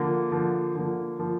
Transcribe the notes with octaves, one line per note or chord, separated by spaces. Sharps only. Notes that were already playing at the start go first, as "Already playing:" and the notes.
Already playing: D3 F3 A#3
D3 F3 A#3
D3 F3 A#3
D3 F3 A#3